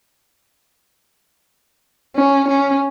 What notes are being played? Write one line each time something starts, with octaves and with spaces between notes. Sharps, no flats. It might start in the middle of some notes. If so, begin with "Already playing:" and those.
C#4
C#4